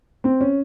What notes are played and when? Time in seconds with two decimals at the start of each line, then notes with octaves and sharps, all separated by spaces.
0.24 C4
0.41 C#4